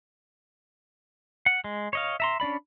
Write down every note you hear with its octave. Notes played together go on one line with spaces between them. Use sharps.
F#5
G#3
C#5 D#5 F5
E5 A#5 C6
C#4 D4 D5 B5